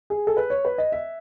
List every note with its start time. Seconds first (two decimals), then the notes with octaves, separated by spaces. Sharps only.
0.10 G#4
0.27 A4
0.37 B4
0.50 C#5
0.65 B4
0.78 D#5
0.92 E5